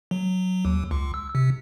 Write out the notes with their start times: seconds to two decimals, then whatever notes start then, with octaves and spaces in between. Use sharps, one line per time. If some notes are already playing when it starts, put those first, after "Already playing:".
0.11 F#3
0.65 D#2
0.91 C#2
1.14 E6
1.35 C3